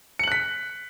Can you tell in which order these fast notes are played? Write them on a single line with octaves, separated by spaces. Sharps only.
C#7 F#7 F#6 B6